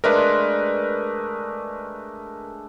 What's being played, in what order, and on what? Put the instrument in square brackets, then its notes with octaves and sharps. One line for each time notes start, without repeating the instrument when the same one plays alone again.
[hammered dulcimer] G#3 A3 D4 [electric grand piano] A#4 B4